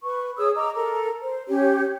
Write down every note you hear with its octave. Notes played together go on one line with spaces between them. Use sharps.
B4 C#6
G#4 C#5 D#6 E6
D#5 A#5 D6 E6
A4 A#4 A#5
C5
C#4 G4 C#5